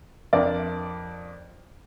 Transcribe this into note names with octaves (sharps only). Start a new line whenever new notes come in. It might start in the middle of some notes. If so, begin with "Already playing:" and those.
F2 D4 A#4 D5